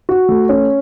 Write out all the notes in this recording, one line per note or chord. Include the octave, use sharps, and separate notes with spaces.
F#4
A3
C#4